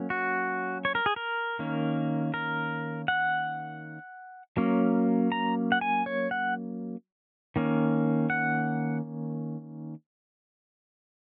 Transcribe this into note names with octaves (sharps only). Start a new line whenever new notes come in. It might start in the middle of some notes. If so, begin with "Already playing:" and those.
Already playing: F#3 A#3 C#4
F#4
C#5
A#4
G#4
A#4
D#3 A#3 C#4
A#4
F#5
F#3 A#3 C#4
A#5
F#5
G#5
C#5
F#5
D#3 A#3 C#4
F#5